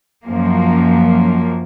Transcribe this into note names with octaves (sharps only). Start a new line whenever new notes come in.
F#2 F3 A#3